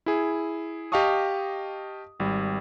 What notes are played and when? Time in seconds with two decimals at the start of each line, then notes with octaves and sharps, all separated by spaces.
0.06 E4 G#4
0.92 G4 D#5 F5 A5 C#6 D#6
2.20 G#1 G3